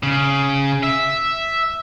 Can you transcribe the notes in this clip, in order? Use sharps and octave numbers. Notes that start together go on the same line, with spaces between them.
C#3
E5